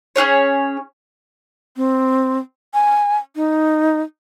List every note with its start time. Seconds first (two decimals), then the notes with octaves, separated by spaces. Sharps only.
0.16 C#4 F4 G#4 C#5
1.77 C4
2.74 G#5
3.36 D#4